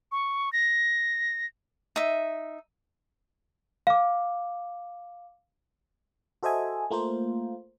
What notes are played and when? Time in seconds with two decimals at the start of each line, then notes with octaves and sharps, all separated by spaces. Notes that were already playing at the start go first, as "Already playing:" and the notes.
0.12 C#6
0.53 A#6
1.96 D#4 E5
3.87 F5 D6
6.43 F#4 A4 C5 D#5 E5 G#5
6.91 A3 A#3 F4 A#4 C5